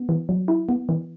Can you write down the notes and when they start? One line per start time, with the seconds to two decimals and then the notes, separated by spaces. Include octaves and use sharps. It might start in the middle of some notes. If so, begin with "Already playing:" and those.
Already playing: B3
0.09 E3
0.29 F#3
0.48 E4
0.69 B3
0.89 E3